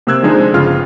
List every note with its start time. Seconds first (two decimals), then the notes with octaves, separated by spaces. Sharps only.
0.07 C3 A#3 C4 E6 F#6 G#6
0.23 D3 F3 G#3 D4 D#4 C5
0.54 G1 C#3 F4 F6